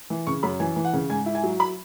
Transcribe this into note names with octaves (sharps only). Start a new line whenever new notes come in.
E3
C#3 C#6
F#2 B5
E3 G#5
E3
F#5
C#3
G#2 G#5
E4
G#5
F#3
B5